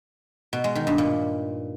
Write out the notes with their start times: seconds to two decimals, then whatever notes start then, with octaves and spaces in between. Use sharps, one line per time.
0.53 B2
0.64 G#3
0.75 D#3
0.87 G2
0.98 A#2